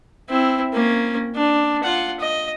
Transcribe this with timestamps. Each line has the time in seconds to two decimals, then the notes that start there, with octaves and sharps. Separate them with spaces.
0.29 C4 E4
0.73 A#3 C#4
1.35 D4
1.83 F4 F#5
2.20 D#5